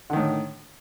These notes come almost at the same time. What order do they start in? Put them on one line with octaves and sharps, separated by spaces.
D3 D#3 A2